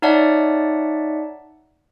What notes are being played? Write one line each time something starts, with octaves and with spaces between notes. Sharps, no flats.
D#4 C#5 D5 E5 F#5 A5